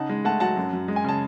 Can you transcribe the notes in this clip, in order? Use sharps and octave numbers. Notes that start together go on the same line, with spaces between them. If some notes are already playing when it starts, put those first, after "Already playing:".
Already playing: C#3 D#4 F#5 A5
G#3
A3 F#5 A5
F#3 F#5 A5
F#2
F#2
G#3
G#5
C#3 A5